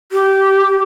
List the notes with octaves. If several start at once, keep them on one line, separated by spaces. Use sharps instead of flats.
G4